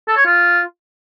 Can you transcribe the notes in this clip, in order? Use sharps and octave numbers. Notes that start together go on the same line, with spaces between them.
A4
C#5
F4